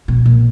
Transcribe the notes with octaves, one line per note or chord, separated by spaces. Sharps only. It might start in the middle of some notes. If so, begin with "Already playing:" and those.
B2
A#2